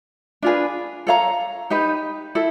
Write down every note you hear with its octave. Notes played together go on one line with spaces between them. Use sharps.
D4 F4 G#4 B4
A4 C#5 F5 A#5
D#4 G4 B4
E4 A4